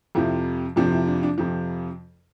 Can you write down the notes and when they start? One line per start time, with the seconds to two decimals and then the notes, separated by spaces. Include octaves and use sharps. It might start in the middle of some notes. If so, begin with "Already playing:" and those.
0.15 F2 C3 F3 E4
0.76 F2 C3 F3 D4
0.92 E4
1.07 D4
1.23 D4
1.38 F2 C3 F3